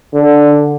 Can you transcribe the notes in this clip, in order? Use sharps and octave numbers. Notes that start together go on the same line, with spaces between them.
D3